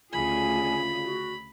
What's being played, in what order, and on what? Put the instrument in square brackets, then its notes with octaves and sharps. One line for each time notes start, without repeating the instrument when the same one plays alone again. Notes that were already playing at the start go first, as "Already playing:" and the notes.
[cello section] D2 C#3 G#4 [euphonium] F4 [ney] G#5 [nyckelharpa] B5
[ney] F#4